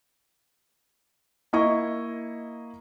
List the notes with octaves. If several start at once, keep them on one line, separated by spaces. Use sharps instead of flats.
A#3 E4 D#5 C#6